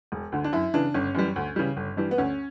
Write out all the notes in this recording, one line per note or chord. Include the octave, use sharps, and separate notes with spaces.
E1
D2 D3
D4
F#2 E4
C#3 E3 D4
G1 C#4
F#2 E3 G3
D2
C#3 E3 G3
G1
G2 E3 G3
B3
D2 C#4